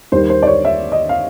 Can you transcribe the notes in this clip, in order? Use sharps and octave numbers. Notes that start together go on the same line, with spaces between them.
D#2 D#3 G3 A#3 C5
C5
D5
C#5
E5
D#5
F5